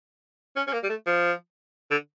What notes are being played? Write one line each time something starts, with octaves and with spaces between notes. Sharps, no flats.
C#4
C#4
A#3
G3
A3
F3
D3